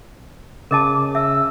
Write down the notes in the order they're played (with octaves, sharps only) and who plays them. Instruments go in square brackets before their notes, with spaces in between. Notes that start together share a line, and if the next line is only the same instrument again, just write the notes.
[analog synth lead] C#3 [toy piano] A#4 D#5 A5 [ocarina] D6
[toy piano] E5 [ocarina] E6